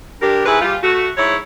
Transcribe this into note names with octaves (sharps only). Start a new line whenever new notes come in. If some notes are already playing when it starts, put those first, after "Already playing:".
G2 D4 G4 A#4
G#2 E4 G#4 B4
G3 F4
A3 F#4
G#2 E4 C#5